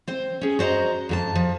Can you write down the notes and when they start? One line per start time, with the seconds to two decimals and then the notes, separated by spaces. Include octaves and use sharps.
0.07 C4 C5
0.41 C#4 G#4
0.59 F#4 C5 C#5 D#5 A#5
1.09 F2 F#4 A5
1.35 F3